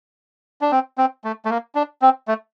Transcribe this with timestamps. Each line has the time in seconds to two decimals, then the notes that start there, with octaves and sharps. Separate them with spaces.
0.61 D4
0.72 C4
0.98 C4
1.24 A3
1.45 A3
1.50 A#3
1.75 D4
2.02 C4
2.28 A3